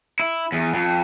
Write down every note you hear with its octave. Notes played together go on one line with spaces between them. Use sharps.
E4
E2
F2